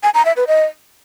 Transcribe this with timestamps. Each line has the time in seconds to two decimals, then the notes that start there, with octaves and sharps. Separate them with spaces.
0.03 G#5
0.14 A#5
0.25 E5
0.36 B4
0.47 D#5